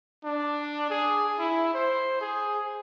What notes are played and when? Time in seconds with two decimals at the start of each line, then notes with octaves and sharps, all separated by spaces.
0.24 D4
0.90 G#4
1.39 E4
1.74 C5
2.21 G#4